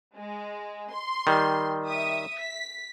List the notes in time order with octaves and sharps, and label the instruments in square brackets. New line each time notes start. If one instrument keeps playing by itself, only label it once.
[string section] G#3
C6
[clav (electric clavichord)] D#3 G3
[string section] E5 D#6
B6